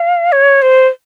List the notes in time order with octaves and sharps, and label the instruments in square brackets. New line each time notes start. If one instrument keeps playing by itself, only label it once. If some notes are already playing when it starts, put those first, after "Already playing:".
Already playing: [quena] F5
C#5
C5